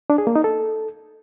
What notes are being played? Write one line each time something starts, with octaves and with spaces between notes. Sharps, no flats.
D4
G#4
A#3
D#4
A4